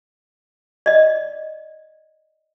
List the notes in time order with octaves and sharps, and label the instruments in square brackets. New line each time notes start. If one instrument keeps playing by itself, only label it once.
[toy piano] D5 D#5